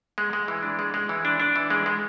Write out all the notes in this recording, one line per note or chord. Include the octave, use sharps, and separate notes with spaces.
G#3
G#3
E3
D4
G#3
G#3
E3
D4
D4
E3
G#3
G#3